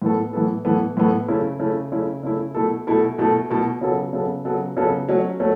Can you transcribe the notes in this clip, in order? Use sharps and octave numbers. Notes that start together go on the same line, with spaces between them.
A2 E3 B3 A4
A2 E3 B3 A4
A2 E3 B3 A4
A2 E3 B3 A4
C#3 A3 E4
C#3 A3 E4
C#3 A3 E4
C#3 A3 E4
B2 A3 E4 A4
B2 A3 E4 A4
B2 A3 E4 A4
B2 A3 E4 A4
C#3 F#3 B3 A4
C#3 F#3 B3 A4
C#3 F#3 B3 A4
C#3 F#3 B3 A4
F#3 A3 C#4
F#3 A3 C#4